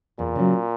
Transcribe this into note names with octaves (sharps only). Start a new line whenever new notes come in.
E2 A#2
C#3 F#3